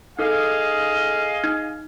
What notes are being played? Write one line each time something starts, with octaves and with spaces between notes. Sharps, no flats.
D#4 G#4 A4 D#5 F5
D#4